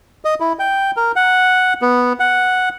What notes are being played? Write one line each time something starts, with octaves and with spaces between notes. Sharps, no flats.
D#5
E4
G5
A#4
F#5
B3
F#5